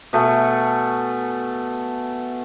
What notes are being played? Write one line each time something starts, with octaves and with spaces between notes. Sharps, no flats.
B2 A3 G#5